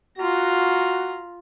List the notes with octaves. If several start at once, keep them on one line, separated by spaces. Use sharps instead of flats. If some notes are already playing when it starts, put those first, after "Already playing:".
F4 F#4 A#5